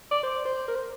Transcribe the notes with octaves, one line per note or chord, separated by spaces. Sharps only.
D5
C5
C5
A#4
C5